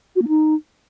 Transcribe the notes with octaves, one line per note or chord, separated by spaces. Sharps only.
F#4
A#3
D#4